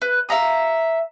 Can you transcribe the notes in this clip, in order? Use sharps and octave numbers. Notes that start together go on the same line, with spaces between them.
B4
E5 F5 A#5 D#6